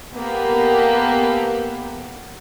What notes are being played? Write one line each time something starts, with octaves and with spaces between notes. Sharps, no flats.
A#3 B3 G4 A4 B4